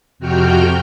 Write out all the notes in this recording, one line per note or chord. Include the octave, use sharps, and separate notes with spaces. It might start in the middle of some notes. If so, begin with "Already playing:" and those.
F2 C3 F#4 G5 F6 G6